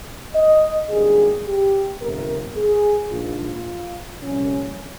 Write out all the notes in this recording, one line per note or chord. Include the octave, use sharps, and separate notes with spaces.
D#5
G#1 G2 G3 A#3 G#4
G4
G1 F2 C3 A#4
G#4
A#1 G#2 F3 F4
C2 A#2 F3 C#4